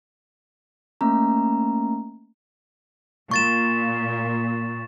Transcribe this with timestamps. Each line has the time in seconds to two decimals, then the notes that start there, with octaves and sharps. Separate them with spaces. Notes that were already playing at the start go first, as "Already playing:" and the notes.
1.01 A3 A#3 C#4 A#5
3.31 A#2 C#6 A6 E7